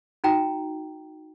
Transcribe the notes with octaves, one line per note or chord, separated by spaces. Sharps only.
D#4 F#4 G5 A#5